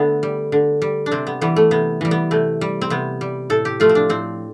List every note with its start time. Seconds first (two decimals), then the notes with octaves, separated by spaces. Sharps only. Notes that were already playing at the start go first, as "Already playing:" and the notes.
Already playing: D3 A3 B3
0.23 G3
0.52 D3
0.82 G3
1.06 D4
1.11 C3 C4
1.27 B3
1.41 E3 G3 B3
1.56 A3
1.71 C3 B3
2.01 E3 G3
2.11 B3
2.31 C3 A3
2.61 G3
2.81 C4
2.90 C3 B3
3.21 G3
3.50 A2 A4
3.65 G4
3.80 F3 A3 F4
3.89 C4
3.95 D4
4.09 A2 C4